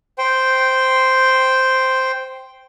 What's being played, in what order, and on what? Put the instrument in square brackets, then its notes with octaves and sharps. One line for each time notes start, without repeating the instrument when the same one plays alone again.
[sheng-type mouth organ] C5 G5